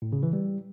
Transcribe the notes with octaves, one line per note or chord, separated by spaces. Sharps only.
A2
C#3
E3
G3